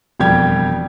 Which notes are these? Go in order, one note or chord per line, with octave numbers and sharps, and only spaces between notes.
E1 F2 G3 G4 G5 G#6